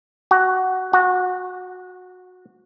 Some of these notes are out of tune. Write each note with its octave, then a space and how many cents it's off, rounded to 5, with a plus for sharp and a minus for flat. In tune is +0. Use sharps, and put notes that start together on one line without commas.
F#4 +10
F#4 -20